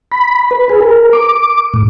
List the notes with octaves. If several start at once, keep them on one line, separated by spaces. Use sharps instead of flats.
B5
B4
G#4
A#4
D6
A2